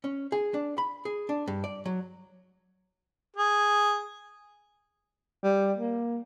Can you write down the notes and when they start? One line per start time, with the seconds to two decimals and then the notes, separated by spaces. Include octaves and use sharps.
0.04 C#4
0.32 G#4
0.54 D4
0.78 B5
1.05 G#4
1.29 D4
1.48 G2
1.64 D5
1.85 F#3
3.36 G#4
5.44 G3
5.78 A#3